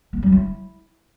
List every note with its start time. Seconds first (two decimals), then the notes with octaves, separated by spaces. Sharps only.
0.13 A#3
0.23 F#3
0.32 E4